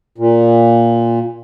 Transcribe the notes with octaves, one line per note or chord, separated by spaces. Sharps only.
A#2